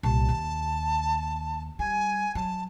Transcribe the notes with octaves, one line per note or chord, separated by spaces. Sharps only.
C2 A#2 A5
D#2
G3 G#5
F#3 A5